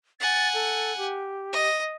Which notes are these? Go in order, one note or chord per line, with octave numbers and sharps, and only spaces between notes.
F#5 G#5 A6
A4
G4
D#5